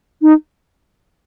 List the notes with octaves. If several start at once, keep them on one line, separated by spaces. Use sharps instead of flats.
D#4